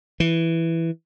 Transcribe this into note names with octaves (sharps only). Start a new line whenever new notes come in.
E3